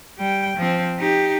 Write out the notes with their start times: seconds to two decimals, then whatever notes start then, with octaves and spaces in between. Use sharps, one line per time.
0.18 G3 G5
0.57 F3 C4
0.99 D#4 G4